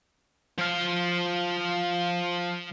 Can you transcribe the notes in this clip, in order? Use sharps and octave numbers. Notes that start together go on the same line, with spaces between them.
F3 F5